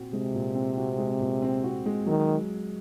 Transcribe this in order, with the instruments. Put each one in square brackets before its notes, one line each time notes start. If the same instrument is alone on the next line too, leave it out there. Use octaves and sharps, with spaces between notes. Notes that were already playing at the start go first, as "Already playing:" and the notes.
Already playing: [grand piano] A#2 C4 F#4
[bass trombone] C3 [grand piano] G#3
[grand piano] A#2
C4
F#4
G#3
A#2
C4
F#4
G#3
[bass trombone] D#3 [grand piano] F#3